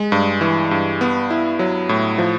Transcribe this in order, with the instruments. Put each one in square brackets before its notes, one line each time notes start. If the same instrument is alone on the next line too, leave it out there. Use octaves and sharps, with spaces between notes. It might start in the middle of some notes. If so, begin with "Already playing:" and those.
Already playing: [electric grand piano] G#3
G2
E3
G2
B3
E4
F#3
A2
F3